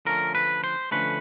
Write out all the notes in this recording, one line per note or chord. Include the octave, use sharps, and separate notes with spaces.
D3 F3 A3 C#4 A#4
B4
C5
D3 F3 A3 C#4 B4